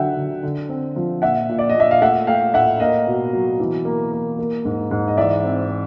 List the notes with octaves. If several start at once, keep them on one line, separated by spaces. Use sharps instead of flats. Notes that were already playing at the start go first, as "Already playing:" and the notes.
Already playing: D3 F#3 E5 F#5 G5
D3
D3
C4
F3
A#2 E5 F#5
A#2
D5
D#5
A#2 E5
F5
A3 E5 F#5
A3 F5 G5
A2 E5 F#5
A#3 D#5 F5
B2
F#3
E3
A#3
A#3
A#3
G#2
G#2
D#5
E3 D5 E5
C4
C4